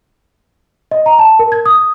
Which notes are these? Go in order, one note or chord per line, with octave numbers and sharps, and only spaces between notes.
D#5
A#5
A5
A#4
G#6
D#6